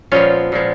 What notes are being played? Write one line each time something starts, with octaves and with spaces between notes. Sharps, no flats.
A#2 F3 G#3 B3 C#4 F4
A#2 F3 G#3 B3